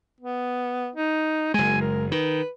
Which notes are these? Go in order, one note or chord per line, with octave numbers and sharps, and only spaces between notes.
B3
D#4
F#1 G#3 G#5
A#4
D#3 B4